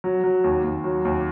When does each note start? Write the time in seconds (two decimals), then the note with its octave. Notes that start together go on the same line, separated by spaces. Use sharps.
0.04 F#3
0.24 F#3
0.44 D#2
0.64 D#2
0.84 F#3
1.05 D#2